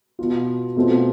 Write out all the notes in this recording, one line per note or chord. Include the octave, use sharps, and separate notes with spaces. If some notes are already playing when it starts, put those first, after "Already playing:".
B2 B3 F4
B2 A3 C4 F4